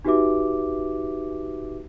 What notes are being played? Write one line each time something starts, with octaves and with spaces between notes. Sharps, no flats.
D#4 F#4 G4 B4 E5 D6